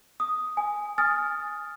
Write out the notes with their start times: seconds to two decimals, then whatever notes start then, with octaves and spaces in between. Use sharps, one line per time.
0.20 D#6
0.57 G#5
0.98 G#5 D#6 F6 A6